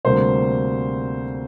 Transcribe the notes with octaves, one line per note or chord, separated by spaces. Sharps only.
D2 C3 G3 A#3 C5